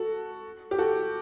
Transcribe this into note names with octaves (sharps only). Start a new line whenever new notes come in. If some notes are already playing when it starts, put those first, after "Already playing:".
Already playing: F#4 A4
G4
F#4 A4